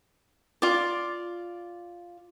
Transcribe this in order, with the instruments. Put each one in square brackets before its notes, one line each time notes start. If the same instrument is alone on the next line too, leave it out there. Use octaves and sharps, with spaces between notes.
[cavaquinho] F4 D5